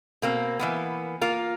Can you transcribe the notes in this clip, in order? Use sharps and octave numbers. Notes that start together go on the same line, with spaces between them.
B2 A#3 C4
E3 A#3 B3
A#3 F4 A#4